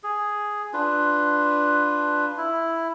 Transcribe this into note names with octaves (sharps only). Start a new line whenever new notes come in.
G#4
D4 F4 B4
E4